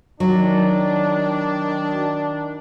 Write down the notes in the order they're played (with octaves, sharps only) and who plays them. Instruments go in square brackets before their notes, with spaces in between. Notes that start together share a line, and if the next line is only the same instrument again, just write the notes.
[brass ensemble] D#3 D4 [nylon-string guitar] F#3